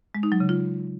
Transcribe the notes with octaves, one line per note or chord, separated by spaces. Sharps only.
G#3
D#4
F#3
C#3
F4